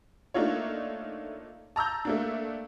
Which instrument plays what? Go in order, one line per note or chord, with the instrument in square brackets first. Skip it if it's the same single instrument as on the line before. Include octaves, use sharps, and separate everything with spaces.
[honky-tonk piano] A3 A#3 D4 D#4 F4 C#5
A5 A#5 E6 G6
A3 A#3 D4